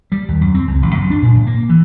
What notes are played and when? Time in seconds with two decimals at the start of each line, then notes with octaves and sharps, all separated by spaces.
0.12 G3
0.28 D#2
0.41 F#2
0.54 C4
0.67 C#2
0.82 A1
0.95 F#2
1.10 D4
1.22 A#2
1.35 A2
1.47 A#3
1.69 E3